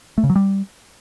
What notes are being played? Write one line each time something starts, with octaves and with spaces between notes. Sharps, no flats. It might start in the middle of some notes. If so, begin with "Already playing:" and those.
A3
C#3
F#3
G3